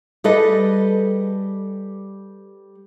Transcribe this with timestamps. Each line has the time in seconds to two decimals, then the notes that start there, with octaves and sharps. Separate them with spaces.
0.24 G3 G#4 A4 B4 D#5